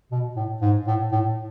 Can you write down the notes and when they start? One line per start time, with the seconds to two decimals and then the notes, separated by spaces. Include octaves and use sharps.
0.11 B2
0.36 A2
0.62 G#2
0.87 A2
1.12 A2